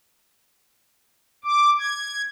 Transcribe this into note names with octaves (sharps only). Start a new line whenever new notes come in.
D6
G#6